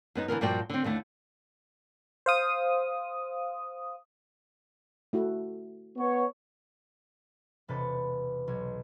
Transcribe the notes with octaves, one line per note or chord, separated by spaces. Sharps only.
F#2 B3 D#4
D3 E3 F#3 A#4
G2 A#2 F3 F#4 D5 G5
D3 C4
D#2 D3 A3
C5 F5 D#6
A3 E4 F#4
B3 B4 C#5
E1 C3 A4 B4 C#5 A6
B1 C#5 G#6